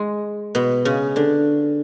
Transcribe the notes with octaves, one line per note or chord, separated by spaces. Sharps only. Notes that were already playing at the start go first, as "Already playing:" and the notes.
Already playing: G#3
B2 B3
C#3 C#4
D3 D4